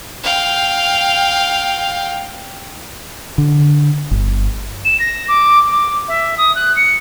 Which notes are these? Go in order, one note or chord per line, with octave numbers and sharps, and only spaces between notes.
F5 G5
D3
G1
E7
A#6
D6
D6
E5
D#6
F#6
C#7